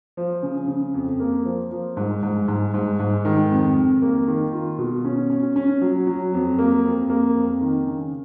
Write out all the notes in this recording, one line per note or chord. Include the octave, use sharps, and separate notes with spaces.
F3
C#3
C#3
F2
A#3
F3
F3
G#2
G#2
G#2
G#2
G#2
D#3
F2
F2
A#3
D#3
F4
B2
C#4
C#4
C#4
F#3
F#3
F2
A#3
F2
A#3
F2
D#3
C#3